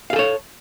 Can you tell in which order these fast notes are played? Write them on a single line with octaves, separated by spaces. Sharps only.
F5 G#4 A4 C#5